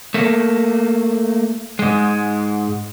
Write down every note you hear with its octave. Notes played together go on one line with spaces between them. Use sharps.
A3 A#3
G#2 G#3